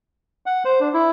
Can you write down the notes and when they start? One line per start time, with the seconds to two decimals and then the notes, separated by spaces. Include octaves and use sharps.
0.46 F#5
0.65 C5
0.80 D4
0.94 E4